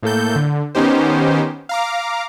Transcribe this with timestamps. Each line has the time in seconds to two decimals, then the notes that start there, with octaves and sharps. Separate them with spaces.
0.03 A2 A#3 A4 G6
0.36 D3
0.75 D#3 B3 C#4 D#4 G4 C5
1.69 F5 A#5 D6